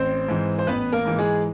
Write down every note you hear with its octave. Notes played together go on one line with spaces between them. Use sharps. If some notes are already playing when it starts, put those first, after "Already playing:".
Already playing: A1 C4 C5
G#2 E3
C5
A1 B3 B4
A#3 A#4
G#2 E3
G#3 G#4